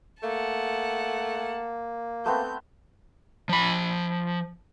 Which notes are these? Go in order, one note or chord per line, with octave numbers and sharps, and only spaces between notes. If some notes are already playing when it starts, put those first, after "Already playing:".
A3 A#3 F#5 A5
A3 B3 C4 G6
F3 B5